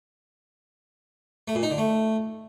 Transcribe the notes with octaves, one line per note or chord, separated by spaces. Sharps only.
A3
A#2
D#4
D3
A3